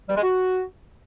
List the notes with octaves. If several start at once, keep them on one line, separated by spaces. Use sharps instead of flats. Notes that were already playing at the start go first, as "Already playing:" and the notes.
G3
G#3
F#4